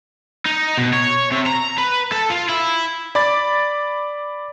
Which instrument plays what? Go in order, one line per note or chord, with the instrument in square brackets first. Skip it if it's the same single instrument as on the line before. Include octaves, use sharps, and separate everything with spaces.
[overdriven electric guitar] D#4
B2
C#5
C3
A#5
B4
A4
F4
E4
[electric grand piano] D5 B5 D6 A6